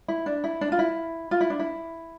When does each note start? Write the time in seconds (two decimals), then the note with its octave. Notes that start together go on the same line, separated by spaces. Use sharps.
0.08 E4
0.26 D4
0.44 E4
0.61 D4
0.72 F4
0.79 E4
1.31 F4
1.41 E4
1.50 D4
1.60 E4